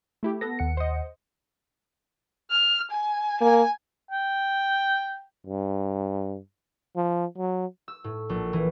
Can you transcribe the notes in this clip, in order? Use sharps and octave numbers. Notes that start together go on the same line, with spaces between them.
A3 E4 G4
B3 A4 A#6
D#2 F#5 C#7
C5 D#5
F6
G#5
A#3 G#5
G5
G2
F3
F#3
E6
A2
A#1
E3